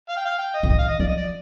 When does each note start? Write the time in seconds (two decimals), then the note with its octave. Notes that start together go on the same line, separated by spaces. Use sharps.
0.09 F5
0.17 G5
0.25 F5
0.39 G5
0.54 D#5
0.63 D3
0.69 D#3 D#5
0.78 F5
0.88 D#5
0.99 F3 D5
1.08 D#5
1.17 D5